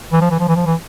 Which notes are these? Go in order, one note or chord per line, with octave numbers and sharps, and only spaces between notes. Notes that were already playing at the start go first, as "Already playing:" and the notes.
E3
F3
E3
F3
E3
F3
E3